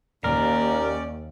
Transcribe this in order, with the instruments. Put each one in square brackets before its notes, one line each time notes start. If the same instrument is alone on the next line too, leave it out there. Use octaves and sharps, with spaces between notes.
[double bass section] D#2 [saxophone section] C#4 G4 D5 [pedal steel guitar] A#4